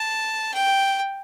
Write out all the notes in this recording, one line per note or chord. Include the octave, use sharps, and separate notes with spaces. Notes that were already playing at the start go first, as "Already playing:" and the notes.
Already playing: A5
G5